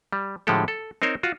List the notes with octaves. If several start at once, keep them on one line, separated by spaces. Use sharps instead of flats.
G3
A2 D3 F3 G#3 G4 A4
A4
C4 D#4 A#4 C5 C#5
F4 F#4